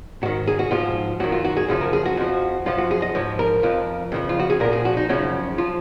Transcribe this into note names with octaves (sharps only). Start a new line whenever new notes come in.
G#2 D#3 F#4
G#4
F#4
G#2 F3 F4
F#2 D#3 F#4
F4
F#4
G#4
F#2 C#3 F3 G#4
A#4
G#4
F#4
F2 F3
F#2 F3 F4
F#4
G#4
D#5
G#2 F3 C#5
A#4
F2 F3
F2 C#3 F3
F4
F#4
G#4
A#2 F3 A#4
G#4
F#4
D#4
F#2 C#3 F3 C#4
F3 F4